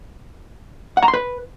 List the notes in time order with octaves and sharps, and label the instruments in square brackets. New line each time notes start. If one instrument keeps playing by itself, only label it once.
[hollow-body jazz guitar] F#5
A#5
C6
B4